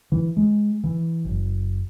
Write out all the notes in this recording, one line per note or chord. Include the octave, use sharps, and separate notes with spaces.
E3
G#3
E3
F#1